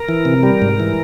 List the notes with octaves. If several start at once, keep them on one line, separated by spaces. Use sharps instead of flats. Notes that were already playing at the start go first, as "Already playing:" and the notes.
Already playing: A#4
E3
C3
G3
G#2
E3